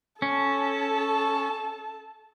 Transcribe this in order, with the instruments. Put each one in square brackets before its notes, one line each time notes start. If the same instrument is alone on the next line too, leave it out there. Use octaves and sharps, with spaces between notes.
[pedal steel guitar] C#4 [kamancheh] A4 A5